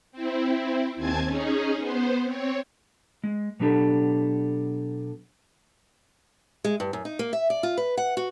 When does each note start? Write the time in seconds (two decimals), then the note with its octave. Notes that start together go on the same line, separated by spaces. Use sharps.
0.12 C4 E4
0.96 D#2 C4 G#5 A5 G#6
1.25 C#4 D#4 G#4
1.79 B3 C5
2.23 C4 C#5
3.24 G#3
3.60 B2 F#3 B3 D4 G4 A4
6.64 G#3
6.80 G2
6.93 F#2
7.05 D#4
7.19 A#3
7.33 E5
7.50 D5
7.63 F4
7.77 B4
7.97 F#5
8.17 F#4